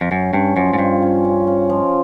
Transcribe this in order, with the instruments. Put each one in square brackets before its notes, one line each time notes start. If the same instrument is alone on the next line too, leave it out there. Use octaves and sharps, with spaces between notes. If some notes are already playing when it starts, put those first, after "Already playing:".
[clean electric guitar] F2
[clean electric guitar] F#2 [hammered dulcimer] C#4
[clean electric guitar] G2 [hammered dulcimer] C#4
[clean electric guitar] F#2 [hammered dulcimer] F3
[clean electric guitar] G#2
[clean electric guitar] G2 [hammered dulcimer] F4
[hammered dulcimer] C#4
C#4
C#4
F3